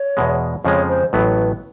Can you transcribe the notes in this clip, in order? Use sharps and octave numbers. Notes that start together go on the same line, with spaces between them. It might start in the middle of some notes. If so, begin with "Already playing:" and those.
Already playing: C#5
E2 B2 G#3
F2 C#3 F3 G#3 C#5
C5
A1 A2 F#3 B3 B4